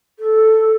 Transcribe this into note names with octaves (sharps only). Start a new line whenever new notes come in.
A4